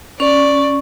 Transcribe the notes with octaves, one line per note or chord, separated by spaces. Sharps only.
C#4 D5 C#6